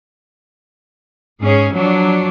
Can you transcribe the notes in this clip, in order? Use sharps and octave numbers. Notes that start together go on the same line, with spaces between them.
G#2 C#4 G#4
F3 F#3 D4